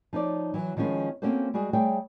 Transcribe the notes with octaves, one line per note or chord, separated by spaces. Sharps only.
F3 D#4 C#5 D5
E3 F#3
D#3 F3 G#3 C#4 G#4 B4
A#3 C4 C#4 F#4 A4 C5
G3 G#3 F#4 G#4
G3 A3 G#4 C#5 G5